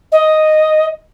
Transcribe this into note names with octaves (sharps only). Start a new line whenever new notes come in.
D#5